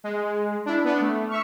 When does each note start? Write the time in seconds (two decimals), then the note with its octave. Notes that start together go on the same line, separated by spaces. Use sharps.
0.04 G#3
0.66 D4 E4
0.85 B3 D4
1.01 A3
1.29 E5 C#6 F6